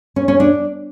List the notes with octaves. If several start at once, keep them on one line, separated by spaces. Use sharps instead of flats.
C#4
C#4
D4